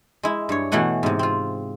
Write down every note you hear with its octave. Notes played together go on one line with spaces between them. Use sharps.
G#3 E4
G2 C#5
B2 E3 A3 F#5 G#5
G#2 C3
C4 F4